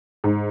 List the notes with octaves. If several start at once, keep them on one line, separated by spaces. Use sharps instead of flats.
G#2